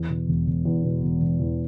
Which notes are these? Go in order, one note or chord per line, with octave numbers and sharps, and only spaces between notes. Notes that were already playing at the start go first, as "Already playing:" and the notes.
Already playing: E2
B2
E1
E1
E2
B2
E1
E1
E2